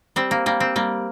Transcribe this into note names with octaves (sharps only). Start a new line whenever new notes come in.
G3 C4
A#3
G3 A#3
C4
G3 A#3